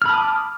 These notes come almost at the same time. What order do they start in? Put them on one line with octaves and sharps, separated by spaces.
F6 B5 A5 D#6 D6